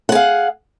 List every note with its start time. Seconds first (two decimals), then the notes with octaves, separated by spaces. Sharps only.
0.09 F#5
0.12 G#4
0.15 F5